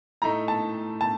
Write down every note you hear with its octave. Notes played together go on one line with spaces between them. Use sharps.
A2 A3 D#4 A#5
A5
A5